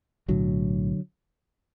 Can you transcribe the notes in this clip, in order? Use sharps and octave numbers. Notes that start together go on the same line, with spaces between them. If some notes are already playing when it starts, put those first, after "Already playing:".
B1 A2 D3 F#3